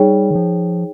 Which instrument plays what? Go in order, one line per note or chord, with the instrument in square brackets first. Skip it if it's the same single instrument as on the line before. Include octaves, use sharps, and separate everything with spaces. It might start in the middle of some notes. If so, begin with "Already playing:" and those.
Already playing: [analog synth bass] G3 [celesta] D#4 G#4 C#5 G5
[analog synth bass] D#3
F3